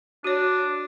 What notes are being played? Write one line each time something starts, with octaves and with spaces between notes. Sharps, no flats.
D4 F#4 C#5